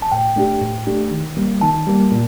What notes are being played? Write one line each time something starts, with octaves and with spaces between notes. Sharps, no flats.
A5
A2 G5
A3 D4 G4
A2
A3 D4 G4
D#3
G3 A#3
D#3 A5
G3 A#3
A#2